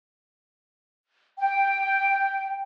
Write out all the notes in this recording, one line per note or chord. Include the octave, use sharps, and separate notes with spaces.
G5